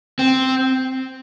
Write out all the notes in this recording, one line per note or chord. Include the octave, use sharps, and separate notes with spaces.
C4